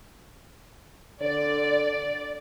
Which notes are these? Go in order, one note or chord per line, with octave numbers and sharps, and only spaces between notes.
D3 D5